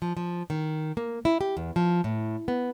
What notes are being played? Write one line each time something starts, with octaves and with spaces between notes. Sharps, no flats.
F3
F3
D#3
A#3
E4
G4
E2
F3
A2
B3